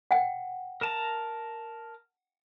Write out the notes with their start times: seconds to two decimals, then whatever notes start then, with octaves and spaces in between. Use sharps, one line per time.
0.11 F#5 G5
0.81 A#4 A5 A#5